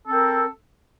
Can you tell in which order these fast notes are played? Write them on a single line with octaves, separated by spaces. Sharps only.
A4 C4 A#4